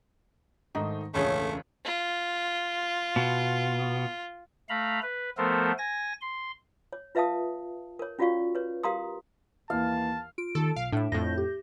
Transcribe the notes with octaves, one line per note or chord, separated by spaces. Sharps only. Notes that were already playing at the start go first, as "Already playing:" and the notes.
G#2 D#3 A3 D#4
E1 C#2 A2 A3 C#4 G#4 C#5
F4
B2
A3 F5 A#5 B5
B4
F3 A3 B3 A4 A#4 C5
G#5 A#6
C6
C#5
F4 B4 E5 F5 A5 D#6
A#4 C#5
C#4 F4 F#4 D5 F5 C#6
B4 C#5
G4 A#4 F5 A#5 C6 D#6
D#2 E3 F5 A5
F4 D7
D#2 A4
B1 F5
A2 A3 D4 E5
F2 A2 G6 A#6
G4